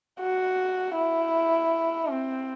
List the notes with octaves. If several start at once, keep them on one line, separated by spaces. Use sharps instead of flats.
F#4
E4
C4